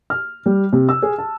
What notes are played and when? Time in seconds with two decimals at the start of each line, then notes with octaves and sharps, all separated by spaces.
0.10 F6
0.46 G3
0.73 C3
0.89 E6
1.02 G#4
1.18 A5